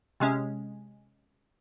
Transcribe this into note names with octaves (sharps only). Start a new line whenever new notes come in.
C3 G#3 C#4